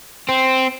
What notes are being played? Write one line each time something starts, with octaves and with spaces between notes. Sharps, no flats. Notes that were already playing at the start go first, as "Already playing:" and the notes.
C4